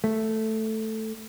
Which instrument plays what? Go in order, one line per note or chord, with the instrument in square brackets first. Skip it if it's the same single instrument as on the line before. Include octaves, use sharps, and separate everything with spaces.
[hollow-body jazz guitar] A3